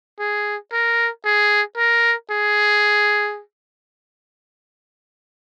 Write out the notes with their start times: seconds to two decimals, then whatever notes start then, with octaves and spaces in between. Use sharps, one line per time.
0.19 G#4
0.73 A#4
1.25 G#4
1.77 A#4
2.31 G#4